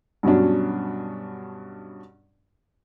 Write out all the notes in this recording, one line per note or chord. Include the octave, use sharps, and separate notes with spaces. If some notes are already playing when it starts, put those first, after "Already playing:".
G2 B2 F#3 C#4 D4